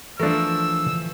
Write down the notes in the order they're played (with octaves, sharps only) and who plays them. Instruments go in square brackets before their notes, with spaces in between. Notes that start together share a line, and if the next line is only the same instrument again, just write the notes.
[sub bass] E3 [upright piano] F3 A3 [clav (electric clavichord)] D4 A#4 [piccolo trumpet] E6